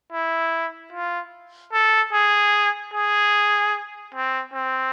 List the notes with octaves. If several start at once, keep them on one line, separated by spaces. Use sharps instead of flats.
E4
F4
A4
G#4
G#4
C4
C4